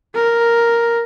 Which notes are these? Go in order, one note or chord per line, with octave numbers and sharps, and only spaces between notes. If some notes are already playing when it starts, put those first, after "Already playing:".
A#4